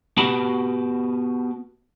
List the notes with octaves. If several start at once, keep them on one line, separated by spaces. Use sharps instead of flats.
B3 F#4 G4 B4 A5 B5